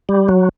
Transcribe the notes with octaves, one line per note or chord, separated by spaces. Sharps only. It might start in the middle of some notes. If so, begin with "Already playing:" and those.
G3
F#3